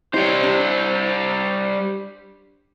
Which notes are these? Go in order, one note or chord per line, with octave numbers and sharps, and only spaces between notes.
G3 D#4 G4 C5 C#5
D4